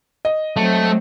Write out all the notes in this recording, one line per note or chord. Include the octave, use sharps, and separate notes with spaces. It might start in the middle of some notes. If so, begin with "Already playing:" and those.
D#5
F#3 A3 C4